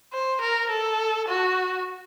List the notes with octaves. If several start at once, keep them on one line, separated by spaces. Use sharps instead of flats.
C5
A#4
A4
F#4